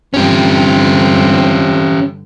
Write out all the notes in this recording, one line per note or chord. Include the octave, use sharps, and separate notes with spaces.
G2 D3 F3 C4 C#4 G4